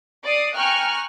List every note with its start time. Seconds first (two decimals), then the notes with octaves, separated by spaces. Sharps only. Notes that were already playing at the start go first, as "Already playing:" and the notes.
0.24 D5 D#6 C7
0.56 G5 G#5 A#5 C#6 F6 F#6